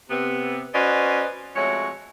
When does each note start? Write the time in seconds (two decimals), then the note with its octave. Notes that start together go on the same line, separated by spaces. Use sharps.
0.09 C3 B3
0.73 C#4 F#4 B4 C5 D5 D#5
1.56 F2 G#3 A3 F#4 C#5